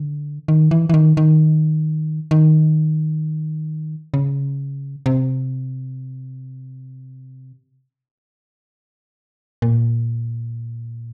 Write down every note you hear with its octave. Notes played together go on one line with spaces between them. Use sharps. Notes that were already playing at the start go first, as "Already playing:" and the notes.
Already playing: D3
D#3
E3
E3
D#3
D#3
D#3
C#3
C3
A#2